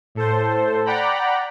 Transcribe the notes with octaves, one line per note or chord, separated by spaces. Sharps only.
A2 A4 C5
D5 F#5 G5 A#5 B5